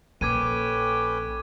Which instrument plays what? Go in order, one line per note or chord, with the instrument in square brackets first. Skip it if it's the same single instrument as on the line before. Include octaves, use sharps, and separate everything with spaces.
[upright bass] A#1 [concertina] C#4 B4 G5 [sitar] A4 [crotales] D6 G#6 D#7